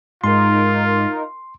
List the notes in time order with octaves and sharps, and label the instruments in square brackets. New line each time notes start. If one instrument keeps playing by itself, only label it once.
[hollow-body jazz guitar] G#2 [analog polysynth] D#4 A#4 [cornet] F4 [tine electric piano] C6